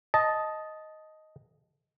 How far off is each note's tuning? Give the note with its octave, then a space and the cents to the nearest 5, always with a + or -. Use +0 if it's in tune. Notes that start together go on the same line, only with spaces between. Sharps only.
D#5 +5 A5 -10